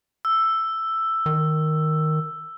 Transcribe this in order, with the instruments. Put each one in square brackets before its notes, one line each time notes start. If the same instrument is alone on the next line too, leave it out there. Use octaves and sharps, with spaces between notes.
[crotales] E6
[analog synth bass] D#3